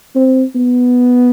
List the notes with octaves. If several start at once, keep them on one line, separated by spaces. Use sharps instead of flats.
C4
B3